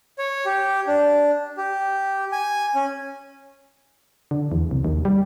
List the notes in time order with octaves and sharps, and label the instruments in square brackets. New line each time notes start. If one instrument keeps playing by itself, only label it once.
[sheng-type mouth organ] C#5
G4
D4
G4
G#5
C#4
[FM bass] D3
E2
C2
D#2
G3